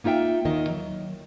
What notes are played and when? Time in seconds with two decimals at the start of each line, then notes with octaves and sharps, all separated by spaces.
0.04 A#3 D#4 F4 E5 G5
0.45 D#2 D#3 D#5
0.68 F#3